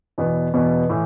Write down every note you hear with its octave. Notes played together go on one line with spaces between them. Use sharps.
E2 B2 B3
E2 B2 B3
A2 E3